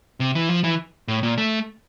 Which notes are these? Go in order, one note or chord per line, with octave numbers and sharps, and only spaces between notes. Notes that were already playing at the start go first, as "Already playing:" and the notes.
C3
E3
F3
E3
A2
A#2
A3